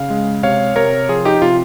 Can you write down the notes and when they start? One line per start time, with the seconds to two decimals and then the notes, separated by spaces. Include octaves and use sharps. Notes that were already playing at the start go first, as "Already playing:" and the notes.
Already playing: C#3 F5
0.10 G#3
0.43 C3 C#5 F5
0.75 C3 A#4 C#5
1.09 F3 F4 G#4
1.25 D#4 G4
1.42 C3 F4